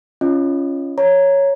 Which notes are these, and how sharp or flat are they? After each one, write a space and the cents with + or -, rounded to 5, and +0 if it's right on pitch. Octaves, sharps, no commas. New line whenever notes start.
C#4 +0 F4 -20 D#5 -10
C#5 +0 A#5 +0